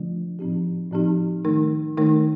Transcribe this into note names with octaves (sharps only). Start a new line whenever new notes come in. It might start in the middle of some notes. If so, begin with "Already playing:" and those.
Already playing: D3 F3 A3 D4 F4
A2 F3 C4 D#4 G4
A2 F3 C4 D#4 G4
D#3 A3 D#4 A#4
D#3 A3 D#4 A#4